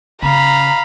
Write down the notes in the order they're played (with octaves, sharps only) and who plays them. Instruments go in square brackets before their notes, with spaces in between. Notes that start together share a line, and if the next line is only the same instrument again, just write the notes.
[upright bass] C#3 [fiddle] F5 B5 [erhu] A#5